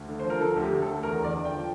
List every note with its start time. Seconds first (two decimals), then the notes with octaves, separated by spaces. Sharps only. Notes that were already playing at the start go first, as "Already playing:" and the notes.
Already playing: D2
0.09 D3
0.19 C5
0.24 F3
0.30 A#4
0.41 D3 A4
0.56 D2
0.61 G4
0.72 D2
0.82 A4
0.88 D2
1.03 E2 A#4
1.19 E2
1.24 D5
1.34 D3
1.45 G5
1.51 F3